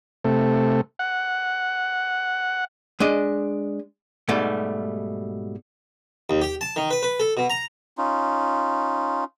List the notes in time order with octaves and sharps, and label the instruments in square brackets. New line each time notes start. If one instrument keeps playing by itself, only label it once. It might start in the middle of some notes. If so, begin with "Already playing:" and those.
[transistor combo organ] C3 A3
F#5
[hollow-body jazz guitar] G#3 D4 D#5
G#2 B2 G3 A3
[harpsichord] D#2
G4
A5
D#3
B4
B4
A4
B2
A#5
[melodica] C#4 D#4 F4